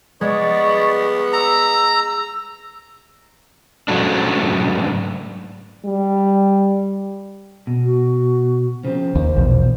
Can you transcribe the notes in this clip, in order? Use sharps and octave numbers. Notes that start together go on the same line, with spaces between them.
G#3 B3 D5 C#6
A#5 E6
G#2 C#3 F#3 A3 D4
G3
B2
F#4
C#3 F3 C4 C5
D#2 A#3
A#1 E2 B2